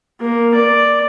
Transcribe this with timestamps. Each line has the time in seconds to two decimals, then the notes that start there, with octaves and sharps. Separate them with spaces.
0.21 A#3
0.55 D5